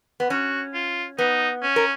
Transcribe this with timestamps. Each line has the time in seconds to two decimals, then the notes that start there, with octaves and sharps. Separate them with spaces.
0.20 B3
0.30 C#4 F#4
0.74 F4
1.19 B3 D#4
1.62 C#4
1.76 A#4